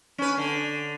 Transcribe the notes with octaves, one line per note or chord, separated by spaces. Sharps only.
C#4 B4
D3